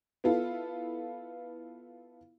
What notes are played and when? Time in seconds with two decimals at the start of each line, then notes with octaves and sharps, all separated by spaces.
0.24 B3 E4 F4 A4